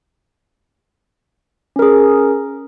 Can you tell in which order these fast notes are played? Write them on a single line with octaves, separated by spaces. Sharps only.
C#4 A#4 G#4